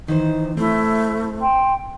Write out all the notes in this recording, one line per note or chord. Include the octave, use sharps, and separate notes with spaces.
D#3 E3 D#4 C5
A3 C4 E4
G5 C6